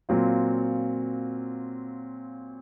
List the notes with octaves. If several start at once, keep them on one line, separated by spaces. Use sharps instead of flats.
A#2 F#3 C4 F4